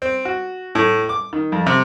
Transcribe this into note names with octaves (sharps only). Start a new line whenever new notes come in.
C4
F#4
A2
D6
D#3
F2
C3